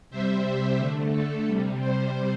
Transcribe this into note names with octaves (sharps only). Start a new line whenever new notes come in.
C3 G3 C5 E5
D3 A3
A4
C3 G3
C5